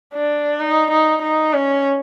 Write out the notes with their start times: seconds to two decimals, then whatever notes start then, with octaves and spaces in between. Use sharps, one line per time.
0.14 D4
0.60 D#4
0.91 D#4
1.22 D#4
1.53 C#4